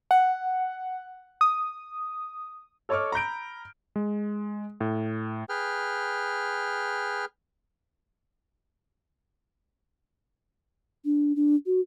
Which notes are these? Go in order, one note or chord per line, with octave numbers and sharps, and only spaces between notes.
F#5
D#6
A4 C#5 D#5 C#6 D6 F6
A#5 B5 G6 D7
G#3
A2
G#4 B4 G5 F6
D4
D4
F#4